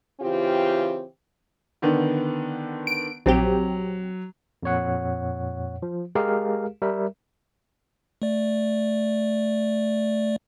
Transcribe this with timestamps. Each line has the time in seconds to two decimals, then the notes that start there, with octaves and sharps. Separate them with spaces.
0.21 C#3 E3 C4 F4 G4
1.82 D3 D#3 B3
2.87 D7
3.26 A#1 F#3 C4 G4
4.63 F2 A#2 C#5 F#5
5.82 F3
6.15 G#3 G4 G#4 A#4 F5
6.82 G3 A#4 E5
8.22 A3 D5